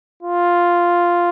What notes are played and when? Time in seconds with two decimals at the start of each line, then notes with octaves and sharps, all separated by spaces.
0.23 F4